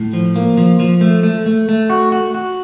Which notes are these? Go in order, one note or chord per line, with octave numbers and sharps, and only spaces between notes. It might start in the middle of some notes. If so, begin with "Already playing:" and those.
Already playing: A2
F3
A#3
F3
F3
A3
A3
A3
A3
F#4
F#4
F#4